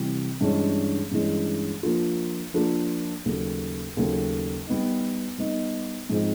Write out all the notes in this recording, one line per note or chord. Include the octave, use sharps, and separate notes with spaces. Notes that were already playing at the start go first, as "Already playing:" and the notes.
Already playing: C3 E3 G3
G2 E3 G#3 C#4
G2 E3 G#3 C#4
F3 A#3 D4 F4
F3 A#3 D4 F4
D#2 C#3 F#3 A3
D#2 C#3 F#3 A3
G3 B3 D#4
G3 B3 D#4
G#2 F3 G#3 C4 D#4